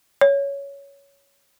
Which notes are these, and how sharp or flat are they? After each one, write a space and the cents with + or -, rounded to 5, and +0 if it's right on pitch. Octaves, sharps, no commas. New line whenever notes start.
C#5 +10